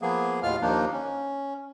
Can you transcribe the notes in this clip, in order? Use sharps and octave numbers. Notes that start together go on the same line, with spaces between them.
F3 A#3 B3 G#4
D#2 A2 G#3 F4 F5 F6
D#2 F3 A#3 D4 D#4
C#4